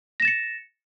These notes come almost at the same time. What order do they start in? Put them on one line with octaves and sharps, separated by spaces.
A#6 E7 A6 C#7